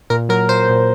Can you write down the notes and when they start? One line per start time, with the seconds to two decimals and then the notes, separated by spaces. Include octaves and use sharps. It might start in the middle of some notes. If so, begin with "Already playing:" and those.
0.10 A#2 A#4
0.29 F#3 A#4
0.49 A#2 C5
0.69 A#2